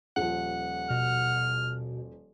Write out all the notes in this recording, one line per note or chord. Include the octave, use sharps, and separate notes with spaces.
D#1 F3 F#5
B2 F6